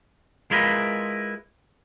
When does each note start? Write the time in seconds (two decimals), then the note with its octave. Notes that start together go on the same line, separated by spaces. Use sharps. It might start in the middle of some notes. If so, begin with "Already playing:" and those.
0.51 G#3 E4 F4 A#4 B4